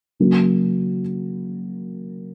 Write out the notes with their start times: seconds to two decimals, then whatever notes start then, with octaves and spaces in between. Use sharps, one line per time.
0.20 C#3 F#3 A#3